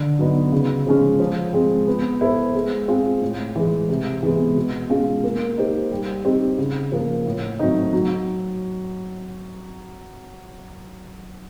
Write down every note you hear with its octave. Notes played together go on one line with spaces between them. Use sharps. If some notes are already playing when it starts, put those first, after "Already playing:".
Already playing: D3
F#3 B3 D#4
C#3
F3 G#3 C#4
F3
G#3 C4
B3
E4 A4 C5
G#3
C4 F4 G#4
A2
E3 G#3
C3
E3 G#3 B3
B2
G#3 C#4 F4
A#3
D#4 G4 C5
G3
C4 D#4 G4
C#3
F3 A#3
A2
F#3 A3 C4 D#4
F#3